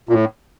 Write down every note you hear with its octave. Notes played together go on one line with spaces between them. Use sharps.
A#2
A2